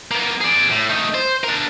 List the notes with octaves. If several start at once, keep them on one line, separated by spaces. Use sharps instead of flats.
A#3 B3
G#4 D5
A2
A3 D#4
C5
D4 A#4